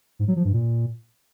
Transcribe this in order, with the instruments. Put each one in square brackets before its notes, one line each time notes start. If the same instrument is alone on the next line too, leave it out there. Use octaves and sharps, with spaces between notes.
[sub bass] G#2
F#3
F3
G2
A#2